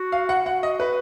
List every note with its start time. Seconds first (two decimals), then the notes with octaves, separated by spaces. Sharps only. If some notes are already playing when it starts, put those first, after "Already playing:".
Already playing: F#4
0.12 F5
0.29 F#5
0.46 F#4 F#5
0.63 D#5
0.80 B4